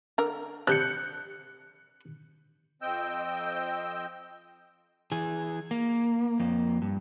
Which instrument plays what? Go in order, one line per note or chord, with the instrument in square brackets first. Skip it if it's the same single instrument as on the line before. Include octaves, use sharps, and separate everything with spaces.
[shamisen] D3 A#4
[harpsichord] C3 [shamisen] D4 [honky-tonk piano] F#6 G6 C#7
[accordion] F2 C4 D#5 G5 E6 G6
[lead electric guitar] E3 G#4
A#3
F2 A#3
G2